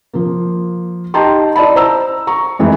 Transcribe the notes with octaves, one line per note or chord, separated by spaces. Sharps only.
F3 A#3
D#4 G4 G5 A5 A#5 C6
E4 D5 D#5 A5 B5
C5 A#5 E6
A#5 C#6
F2 E3 G#3 A3